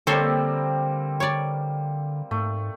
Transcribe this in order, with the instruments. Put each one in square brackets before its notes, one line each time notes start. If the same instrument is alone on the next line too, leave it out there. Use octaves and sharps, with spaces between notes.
[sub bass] D3 [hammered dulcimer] G3 A#3 C4 [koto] A4 C5 C#5
[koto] C#5 D5
[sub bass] G#2 [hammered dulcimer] A3